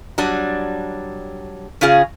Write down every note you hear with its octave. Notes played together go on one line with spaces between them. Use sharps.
F#3 G3 D4
C#3 C#4 F4 G#4